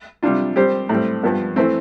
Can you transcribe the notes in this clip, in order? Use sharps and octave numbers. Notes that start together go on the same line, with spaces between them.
C3 G3 D4 F4
G3 C4 G4 C5
A2 G3 C4
G2 F3 B3
E3 A3 C4